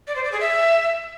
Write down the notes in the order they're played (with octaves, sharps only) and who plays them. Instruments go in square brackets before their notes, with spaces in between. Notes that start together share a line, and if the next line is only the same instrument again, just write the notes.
[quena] D5
C5
D5
G#4
E5